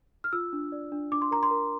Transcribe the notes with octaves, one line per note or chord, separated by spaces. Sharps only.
F6
F4 E6
D4
D5
D4
D4 D6
C6
A#4 A#5
C6
A#4